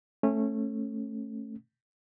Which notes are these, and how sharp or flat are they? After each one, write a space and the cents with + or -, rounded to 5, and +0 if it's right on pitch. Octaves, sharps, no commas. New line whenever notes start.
A3 +0 C#4 -25